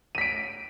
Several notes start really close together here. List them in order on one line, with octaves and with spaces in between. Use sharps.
D#7 B6 D7